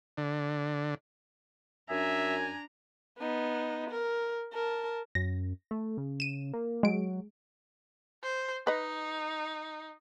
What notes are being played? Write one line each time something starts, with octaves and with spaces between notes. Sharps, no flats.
D3
F#2 D4 E5 G#5 A#5
B3 D#4
A#4
A#4 A5
F#2 A#6
A3
C#3
D#7 E7
A#3
F#3 G#3 D7
C5
D#4 B4 D#5